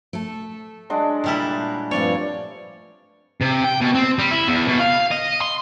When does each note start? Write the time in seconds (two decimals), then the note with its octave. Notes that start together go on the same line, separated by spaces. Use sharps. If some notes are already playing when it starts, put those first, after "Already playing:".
0.13 A3 A4
0.90 F#3 G#3 D4
1.24 A#2 G3 E4
1.91 G2 F3 A3 C4 C#5 D5 F5
3.41 C3
3.64 G5
3.81 B2
3.95 C4
4.19 G3
4.31 E4
4.47 E2
4.68 B2
4.79 F5
5.11 D#5
5.42 C6